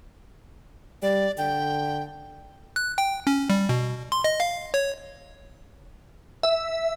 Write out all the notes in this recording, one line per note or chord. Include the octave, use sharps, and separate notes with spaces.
G3 D5
D3 G5
F#6
G5
C#4
G3
B2
C6
D#5
F5
C#5
E5